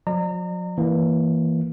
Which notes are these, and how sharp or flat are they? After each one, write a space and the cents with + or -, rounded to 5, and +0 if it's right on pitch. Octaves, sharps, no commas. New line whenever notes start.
F#3 -45 D5 +40 A#5 -30
E3 +0 A#3 +0